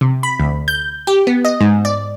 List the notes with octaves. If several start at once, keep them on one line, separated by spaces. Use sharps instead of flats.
C3
B5
D2
G6
G4
B3
D#5
G#2
D5